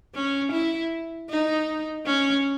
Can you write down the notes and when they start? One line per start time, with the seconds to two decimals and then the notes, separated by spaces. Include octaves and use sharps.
0.15 C#4
0.52 E4
1.29 D#4
2.06 C#4